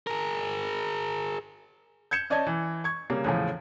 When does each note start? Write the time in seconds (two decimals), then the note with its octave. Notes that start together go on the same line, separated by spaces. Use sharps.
0.07 G#4 A#4
2.11 G6 G#6 C#7 E7
2.30 C#4 D5 D#5 A5 G#6
2.47 E3
2.84 C#6 G#6
3.10 C#3 G3 A#3
3.24 E2 A2 C#3 F3